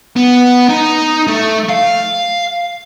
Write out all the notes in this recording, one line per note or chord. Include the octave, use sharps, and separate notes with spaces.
B3
D#4
A3
F5